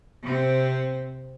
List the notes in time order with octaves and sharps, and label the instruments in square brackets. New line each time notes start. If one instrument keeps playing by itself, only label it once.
[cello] C3 C4